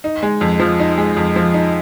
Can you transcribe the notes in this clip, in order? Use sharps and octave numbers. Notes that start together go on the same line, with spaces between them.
D#4
G#3
F2
F3
D#4
G#3
F2
F3
D#4